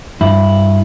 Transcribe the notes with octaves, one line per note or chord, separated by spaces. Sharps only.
G2 E4